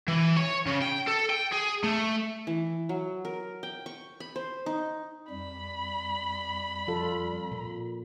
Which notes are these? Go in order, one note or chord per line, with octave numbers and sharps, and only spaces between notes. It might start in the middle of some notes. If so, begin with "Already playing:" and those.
E3
C#5
C#3
G5
A4
G5
G#4
A3
E3
F#3
A#4
G5
C#6
B5
C5
D#4
F2 G3 B5
F3 F4 A4
A#2